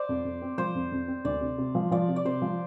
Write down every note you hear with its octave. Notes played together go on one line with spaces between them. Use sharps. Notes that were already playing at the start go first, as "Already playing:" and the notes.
Already playing: C5 D5
F2
F2
C4
F3 C5
F2
F2
C4
D2 D5
C3
C3
F3
F3 D5
C3
D5
C3 C5
F3